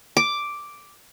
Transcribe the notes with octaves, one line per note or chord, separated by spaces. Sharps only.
D6